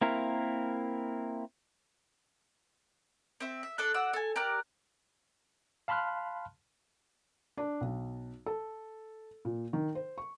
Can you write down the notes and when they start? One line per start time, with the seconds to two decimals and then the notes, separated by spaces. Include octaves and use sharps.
0.01 A#3 C4 E4 A#4
3.40 C4 E5
3.63 E5
3.78 D4 A4 F#6
3.94 F#4 D5 F#5 E6
4.13 A4 G#5
4.36 G4 A#4 D5 F#6
5.88 F5 A5 B5 C6 F6 F#6
7.57 D4
7.81 B1
8.46 A4
9.45 A#2
9.73 D#3
9.95 C5
10.18 C#6